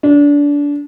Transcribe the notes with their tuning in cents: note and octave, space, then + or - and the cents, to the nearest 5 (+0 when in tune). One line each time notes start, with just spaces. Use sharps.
D4 -25